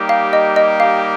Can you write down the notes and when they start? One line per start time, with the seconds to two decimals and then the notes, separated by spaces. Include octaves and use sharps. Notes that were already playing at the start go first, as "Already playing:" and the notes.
Already playing: G3 A#3 D#4 G4
0.09 F5
0.33 D#5
0.56 D#5
0.80 F5